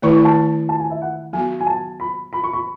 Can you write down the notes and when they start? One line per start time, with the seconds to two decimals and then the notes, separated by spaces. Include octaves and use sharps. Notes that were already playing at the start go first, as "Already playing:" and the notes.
0.02 D#3 A3 E4 B4 C#6
0.14 C#6
0.25 A5
0.69 A5
0.80 G#5
0.90 E5
1.02 F#5
1.33 F#3 B3 F#4 G#5
1.60 G#5
1.67 A5
2.00 B5
2.33 B5
2.44 C#6
2.53 B5